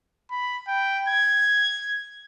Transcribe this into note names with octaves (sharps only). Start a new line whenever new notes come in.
B5
G5
G#6